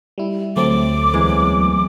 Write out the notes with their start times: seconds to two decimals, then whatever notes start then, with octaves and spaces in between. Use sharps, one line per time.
0.18 G3 E4
0.56 D2 F#3 A3 C4 D6
1.14 E2 E3 G#3